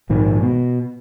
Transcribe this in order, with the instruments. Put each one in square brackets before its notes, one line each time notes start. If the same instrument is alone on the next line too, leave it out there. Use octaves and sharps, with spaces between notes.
[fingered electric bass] A#1 G#2 D#3
B2